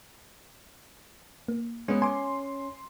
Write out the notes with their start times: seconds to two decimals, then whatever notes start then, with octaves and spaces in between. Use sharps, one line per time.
1.48 A#3
1.88 G#3 B3 C#4
2.02 G#5 C6 D6